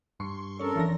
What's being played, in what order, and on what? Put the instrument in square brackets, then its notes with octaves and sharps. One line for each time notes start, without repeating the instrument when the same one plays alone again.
[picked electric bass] G2 [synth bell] C6 C#6
[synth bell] C4 C#4 C#5 [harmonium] A4 A#4
[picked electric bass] F1 F2 D4 [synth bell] E3 A#6